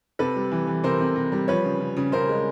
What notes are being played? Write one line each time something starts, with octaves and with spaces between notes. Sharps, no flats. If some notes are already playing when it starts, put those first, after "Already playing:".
C3 A4 B4
G3
E3
E3
C3 A#4 C5
C3
C3
G3
F3 B4 C#5
C#3
C#3
C#3
C#3 A#4 C5
G#3